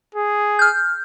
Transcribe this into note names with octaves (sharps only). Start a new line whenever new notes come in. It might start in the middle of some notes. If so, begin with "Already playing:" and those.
G#4
F6 G6